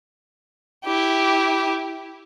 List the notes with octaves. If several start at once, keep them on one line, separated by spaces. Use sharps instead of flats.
E4 G4